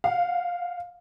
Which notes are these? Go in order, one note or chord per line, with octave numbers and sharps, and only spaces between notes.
F5 F#5